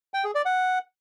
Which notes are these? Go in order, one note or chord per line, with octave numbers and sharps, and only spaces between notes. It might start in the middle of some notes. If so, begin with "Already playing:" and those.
G5
G#4
D5
F#5